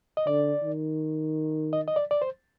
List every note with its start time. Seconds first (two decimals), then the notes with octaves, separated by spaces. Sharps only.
0.17 D#5
0.27 D3 D5
0.64 D#3
1.73 D#5
1.88 D#5
1.96 D5
2.11 D5
2.22 C5